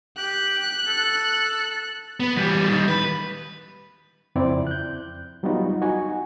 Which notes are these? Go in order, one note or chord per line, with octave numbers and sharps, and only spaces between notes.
G4 F#6
A4
B3
E3 G3
D#3 G3
B4
F2 C#3 C4 E4 D5
F#6 G6
F#3 G3 B3 D#4 F4 F#4
D#4 F#4 G#5